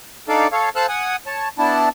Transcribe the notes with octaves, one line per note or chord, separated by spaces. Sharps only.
D4 D#4 A4 D5 F5
A4 C#5 F5
A4 C5 F5 E6 F#6
F#5 G#5 D#6
C#5 A5
B3 D4 E4 A5